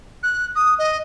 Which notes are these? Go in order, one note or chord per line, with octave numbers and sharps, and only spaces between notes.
F#6
D#6
D#5